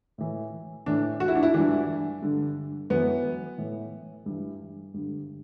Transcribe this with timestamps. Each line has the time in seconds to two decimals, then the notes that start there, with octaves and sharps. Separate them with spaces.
0.18 A2 E3
0.86 A2 E3 D4
1.20 F#4
1.28 E4
1.35 D4
1.43 E4
1.54 G2 E3 D4
2.22 G2 D3
2.90 F#2 E3 B3
3.58 A2 E3
4.26 G2 E3
4.94 G2 D3